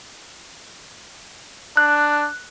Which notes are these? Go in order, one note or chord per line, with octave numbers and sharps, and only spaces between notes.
D4 F#6